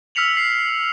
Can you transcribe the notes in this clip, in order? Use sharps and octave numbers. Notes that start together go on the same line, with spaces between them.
E6 F6 B6 C#7 F7 F#7
C7